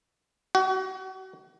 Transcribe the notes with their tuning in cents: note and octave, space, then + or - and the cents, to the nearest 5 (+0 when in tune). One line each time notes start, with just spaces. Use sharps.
F#4 +35